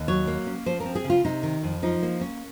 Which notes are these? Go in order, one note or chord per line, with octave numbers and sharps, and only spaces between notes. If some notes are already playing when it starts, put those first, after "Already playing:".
Already playing: D#2
F#3 C#5
A#3
C#4
F3 C5
A#4
C4
G#4
C#3
F4
C3 D#4
D#3
F2
F3 D#4
A#3
C#4